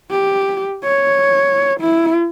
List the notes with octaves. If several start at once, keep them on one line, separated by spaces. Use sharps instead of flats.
G4
C#5
E4